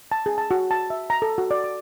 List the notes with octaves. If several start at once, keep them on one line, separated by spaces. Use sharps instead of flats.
A5
G#4
A5
F#4
A5
E5
A#5
A4
F#4
D5
D6